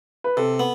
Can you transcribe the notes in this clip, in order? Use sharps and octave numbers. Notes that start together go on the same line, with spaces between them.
B4
C3 A4
B3